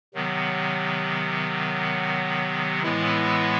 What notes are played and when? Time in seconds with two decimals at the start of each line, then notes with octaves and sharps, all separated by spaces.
0.14 C3 D#3 F#3 B3
2.82 A2 E3 G#3 B3 E4